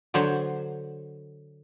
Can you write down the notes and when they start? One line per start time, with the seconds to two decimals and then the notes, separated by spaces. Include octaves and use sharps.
0.14 D3 F#3 C5 C#5